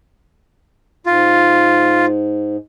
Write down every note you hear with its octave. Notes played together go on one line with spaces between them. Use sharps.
G#2 F4